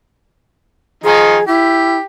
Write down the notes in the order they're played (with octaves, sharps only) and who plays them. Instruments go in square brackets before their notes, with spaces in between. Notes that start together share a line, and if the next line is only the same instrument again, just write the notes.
[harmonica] D#3 F3 D#4 [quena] G#4
[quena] E4 [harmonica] G4